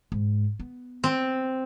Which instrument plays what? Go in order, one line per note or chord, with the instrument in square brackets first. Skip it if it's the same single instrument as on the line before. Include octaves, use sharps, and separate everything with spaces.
[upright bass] G#2
B3
[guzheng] C4